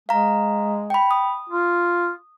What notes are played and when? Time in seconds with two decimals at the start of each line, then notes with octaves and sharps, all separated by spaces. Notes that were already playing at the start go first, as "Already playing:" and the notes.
0.09 G#3 F5 A#5
0.90 G5 B5
1.11 D#6
1.50 F4